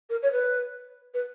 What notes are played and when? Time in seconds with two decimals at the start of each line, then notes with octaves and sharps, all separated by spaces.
0.10 A#4
0.23 C#5
0.32 B4
1.14 B4